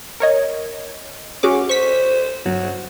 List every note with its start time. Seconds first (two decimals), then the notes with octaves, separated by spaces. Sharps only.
0.20 A#4 C#5 D#5
1.43 C#4 F#4 G#4 D6
1.69 C5 C#6 B6
2.46 G1 F#3